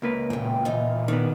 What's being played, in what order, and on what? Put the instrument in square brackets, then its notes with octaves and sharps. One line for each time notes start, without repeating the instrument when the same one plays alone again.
[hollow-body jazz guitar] C#2 A#3 B4
[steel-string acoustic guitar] E2 G5 [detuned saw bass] A#2
[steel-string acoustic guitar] E3 D#4 F4
[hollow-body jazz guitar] D#3 B3 [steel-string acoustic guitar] D4